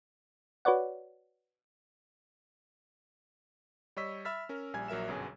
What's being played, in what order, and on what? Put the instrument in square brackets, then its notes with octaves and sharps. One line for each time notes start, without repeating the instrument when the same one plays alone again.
[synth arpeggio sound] F#4 B4 C#5 D5 F#5
[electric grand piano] G3 C#5 D#5 C#6 E6 B6
E5 B5 E6 F6 A6 B6
C#4 A#4
A#1 G3 G#5 G#6
A#1 F#3 A#4 E5 E7
G1 F#2 B2 F#3 G#4 G#5